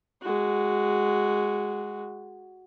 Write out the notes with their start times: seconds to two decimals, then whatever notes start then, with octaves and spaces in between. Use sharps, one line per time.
0.22 G#3 F#4